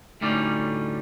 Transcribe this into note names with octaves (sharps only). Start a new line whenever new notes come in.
D2 A2 G3 C#4 D#4 D5